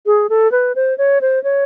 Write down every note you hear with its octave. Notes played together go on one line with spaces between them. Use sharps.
G#4
A4
B4
C5
C#5
C5
C#5